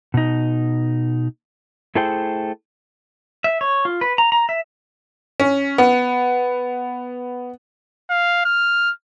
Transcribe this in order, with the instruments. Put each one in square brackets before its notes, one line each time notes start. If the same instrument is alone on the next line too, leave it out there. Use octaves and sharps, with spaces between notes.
[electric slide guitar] B2 D#4
A3 E4 G#4 A4 C5 G5
[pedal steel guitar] E5
C#5
F4
B4
A#5
A#5
E5
[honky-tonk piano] C#4
B3
[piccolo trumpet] F5
F6